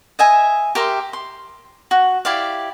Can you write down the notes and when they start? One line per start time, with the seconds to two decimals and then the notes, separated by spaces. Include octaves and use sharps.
0.19 D#5 E5 G#5
0.75 G4 A#4 E5 C6
1.13 C6
1.91 F#4
2.25 E4 G4 D5 F5